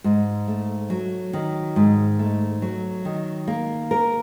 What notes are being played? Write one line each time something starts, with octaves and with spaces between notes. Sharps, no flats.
G#2
A3
F#3
D#3
G#2
A3
F#3
D#3
A#3
A#4